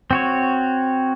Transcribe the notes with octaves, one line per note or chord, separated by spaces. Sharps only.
C4 F#4 C#5